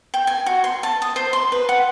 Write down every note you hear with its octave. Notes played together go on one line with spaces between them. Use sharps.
G5
G#5
F#4
C6
A5
D#6
C5
C6
B4
F#5